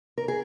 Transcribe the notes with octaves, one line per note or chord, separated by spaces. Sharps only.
A#4
G#4